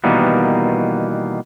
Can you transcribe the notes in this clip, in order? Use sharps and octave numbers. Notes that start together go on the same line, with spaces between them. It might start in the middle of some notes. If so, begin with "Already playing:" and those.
B2 D#3 E3 G3 A#3 B3